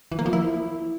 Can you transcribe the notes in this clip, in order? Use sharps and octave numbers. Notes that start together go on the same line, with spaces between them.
E3
A#3
F3
E4